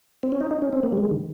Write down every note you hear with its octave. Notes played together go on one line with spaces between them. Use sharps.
C4
C#4
D#4
D#4
C#4
C4
A#3
G3
G#3
D#3